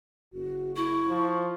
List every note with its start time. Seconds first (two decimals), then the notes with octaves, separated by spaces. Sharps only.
0.33 F#1 F#4
0.76 E4 C#6
1.08 F3